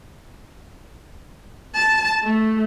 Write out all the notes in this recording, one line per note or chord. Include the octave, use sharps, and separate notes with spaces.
A5
A3